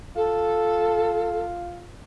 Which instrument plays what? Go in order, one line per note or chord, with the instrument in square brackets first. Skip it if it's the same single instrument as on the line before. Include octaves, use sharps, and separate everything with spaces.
[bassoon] F4 [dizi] A4